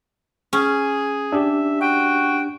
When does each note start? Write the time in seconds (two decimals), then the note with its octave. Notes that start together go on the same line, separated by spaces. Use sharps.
0.53 C#4 G#4
1.32 D4 G4 E5
1.81 F#4 G5